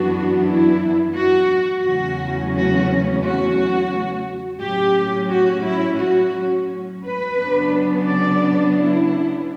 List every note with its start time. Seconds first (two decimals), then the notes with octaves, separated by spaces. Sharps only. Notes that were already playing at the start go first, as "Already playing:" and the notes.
Already playing: F#2 E3 B3 D4 F#4
0.47 E4
1.16 F#4
1.85 E2 C#3 F#3 A3 C#4 F#4
2.54 F#4
3.23 F#4
4.61 A2 F#3 C#4 G4
5.30 F#4
5.65 E4
6.00 F#4
7.03 B4
7.38 C#3 F#3 B3 D4
8.07 D5
8.76 E4